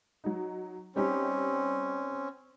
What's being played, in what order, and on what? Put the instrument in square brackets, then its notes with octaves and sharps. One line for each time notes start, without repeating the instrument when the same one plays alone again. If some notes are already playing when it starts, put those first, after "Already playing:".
[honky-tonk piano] F#3 D#4
[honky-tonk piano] G3 D#4 G4 [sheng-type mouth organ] C4 C#4